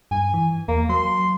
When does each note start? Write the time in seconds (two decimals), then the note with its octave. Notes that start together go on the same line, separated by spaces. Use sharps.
0.11 G2 G#5
0.34 E3
0.68 E2 A#3
0.89 F#3 C6